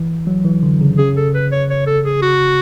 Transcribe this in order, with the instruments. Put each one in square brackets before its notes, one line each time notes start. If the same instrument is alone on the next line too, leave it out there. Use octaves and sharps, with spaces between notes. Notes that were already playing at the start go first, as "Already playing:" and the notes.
Already playing: [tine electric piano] E3
F#3
E3
D3
C#3
[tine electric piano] C#3 [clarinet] G#4
[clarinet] A4
B4
C#5
C#5
A4
G#4
F#4